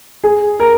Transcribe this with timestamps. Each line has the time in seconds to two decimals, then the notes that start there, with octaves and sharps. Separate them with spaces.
0.24 G#4
0.60 A#4